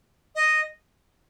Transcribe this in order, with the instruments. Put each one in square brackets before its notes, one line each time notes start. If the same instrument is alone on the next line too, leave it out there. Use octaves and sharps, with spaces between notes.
[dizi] D#5